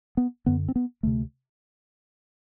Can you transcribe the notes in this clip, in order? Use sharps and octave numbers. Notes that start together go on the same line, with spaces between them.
B3
F#2 D3 B3
C4
B3
D2 C3 A3